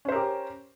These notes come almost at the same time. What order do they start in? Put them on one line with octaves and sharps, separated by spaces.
C#4 C5 A#4 G4